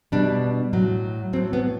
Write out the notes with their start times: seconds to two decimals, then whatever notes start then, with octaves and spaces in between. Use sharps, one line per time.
0.12 B2 G3 D4
0.73 A2 F#3
1.33 F#3 C4
1.36 A2
1.53 B3